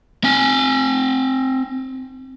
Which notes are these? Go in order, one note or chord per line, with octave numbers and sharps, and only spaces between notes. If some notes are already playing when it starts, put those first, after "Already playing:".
C4 G#5